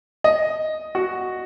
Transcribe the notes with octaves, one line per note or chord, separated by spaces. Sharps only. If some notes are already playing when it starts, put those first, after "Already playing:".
D#5
F#4